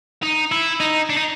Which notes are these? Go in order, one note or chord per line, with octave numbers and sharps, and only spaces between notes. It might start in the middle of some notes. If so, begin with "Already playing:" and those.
D#4
E4
D#4
D4
D#4